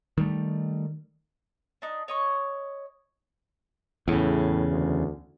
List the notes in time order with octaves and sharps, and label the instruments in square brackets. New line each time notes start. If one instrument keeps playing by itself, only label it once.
[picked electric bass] D#3 G3 A3
[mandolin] D4 D#4
C#5 D#5 C#6
[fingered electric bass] E2 C#3 [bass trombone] A2
[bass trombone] D2